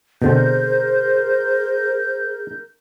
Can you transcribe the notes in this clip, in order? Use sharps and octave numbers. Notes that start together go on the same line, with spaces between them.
B2 D3 C4 G#4 A#4 C5 G6